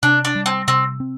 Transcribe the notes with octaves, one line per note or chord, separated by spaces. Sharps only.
C3 D4
D4
G3
C4
C3 C4
C4